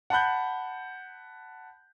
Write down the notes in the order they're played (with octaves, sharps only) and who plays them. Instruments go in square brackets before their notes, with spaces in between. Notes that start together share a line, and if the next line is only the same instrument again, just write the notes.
[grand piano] F#5 A5 B5 F#6 G6